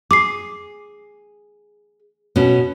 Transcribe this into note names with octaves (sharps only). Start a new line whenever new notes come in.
G#4 D6 C7
B2 C#4